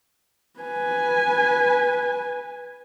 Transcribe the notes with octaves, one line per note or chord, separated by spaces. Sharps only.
B4 G#5